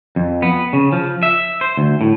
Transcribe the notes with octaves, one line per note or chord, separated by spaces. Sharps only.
F2
B3
C#3
F3
E5
C5
D2
A2